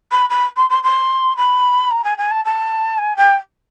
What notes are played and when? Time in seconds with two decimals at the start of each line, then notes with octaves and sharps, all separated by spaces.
0.11 B5
0.29 B5
0.56 C6
0.69 C6
0.83 C6
1.37 B5
1.91 A#5
2.04 G#5
2.17 G#5
2.31 A5
2.45 A5
2.98 G#5
3.16 G5